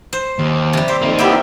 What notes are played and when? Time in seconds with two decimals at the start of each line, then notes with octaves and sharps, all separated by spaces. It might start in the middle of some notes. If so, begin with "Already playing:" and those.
0.13 C5
0.39 D#2
0.73 C3 G3
0.88 C5 E5 C6 D6
1.02 F2 A#3 D#4
1.18 B3 E4 G4 A#4 E5 G5